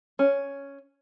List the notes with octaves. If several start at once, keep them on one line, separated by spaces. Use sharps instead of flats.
C#4